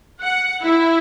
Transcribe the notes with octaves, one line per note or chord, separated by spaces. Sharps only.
F#5
E4